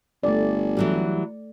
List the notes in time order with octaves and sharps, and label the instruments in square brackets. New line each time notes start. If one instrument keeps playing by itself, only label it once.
[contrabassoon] G1 [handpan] A3 D5
[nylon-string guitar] E3 F#3 G3